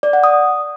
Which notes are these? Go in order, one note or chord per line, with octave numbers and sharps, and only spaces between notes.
D5
F#5
D#6